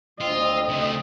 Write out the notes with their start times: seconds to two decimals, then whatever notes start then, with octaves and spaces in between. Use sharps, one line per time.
0.21 D2 C4 F4 D#5
0.69 C#3 A3